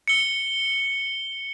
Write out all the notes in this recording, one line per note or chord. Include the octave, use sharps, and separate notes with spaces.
C#7 G7